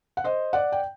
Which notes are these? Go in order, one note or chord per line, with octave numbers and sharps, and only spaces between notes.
F#5
C5 D#5
D5 F#5
G5